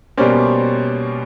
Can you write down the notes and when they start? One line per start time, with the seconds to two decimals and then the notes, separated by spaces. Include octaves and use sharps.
0.17 B2 G3 A#3 C#4 C5 D5